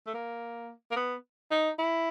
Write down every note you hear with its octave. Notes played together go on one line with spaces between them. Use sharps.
A3
A#3
A#3
B3
D#4
E4